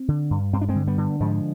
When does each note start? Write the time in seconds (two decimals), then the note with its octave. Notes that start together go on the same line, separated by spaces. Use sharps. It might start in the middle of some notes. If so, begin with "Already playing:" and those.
Already playing: C4
0.08 D3
0.31 G2
0.53 G2 C4
0.61 D4
0.69 G#3 C4
0.75 D3
0.87 G3 B3
0.98 D3
1.20 G#2 F3 G#3